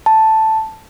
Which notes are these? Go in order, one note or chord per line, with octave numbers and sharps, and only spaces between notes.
A5